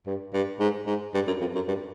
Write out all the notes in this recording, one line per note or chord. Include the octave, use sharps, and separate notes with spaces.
G2
G2
G#2
G#2
G2
F#2
F2
F#2
G2